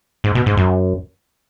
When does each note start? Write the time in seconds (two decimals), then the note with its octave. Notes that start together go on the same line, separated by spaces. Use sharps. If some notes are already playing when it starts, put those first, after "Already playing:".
0.24 G#2
0.35 B2
0.46 G#2
0.57 F#2